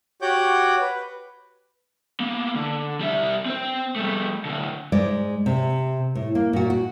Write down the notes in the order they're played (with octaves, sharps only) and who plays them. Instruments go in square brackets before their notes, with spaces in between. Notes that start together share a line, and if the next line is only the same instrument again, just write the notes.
[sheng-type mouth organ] F#4 G4 C#5 F#5 D6 G6
B4
[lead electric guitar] A#3 B3
D3
G3 E5
C4 C5
G3 A3
D3 F#3
[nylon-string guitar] G#2 G#3 D5
C3
A2
A#3
A#2 F#4
F#4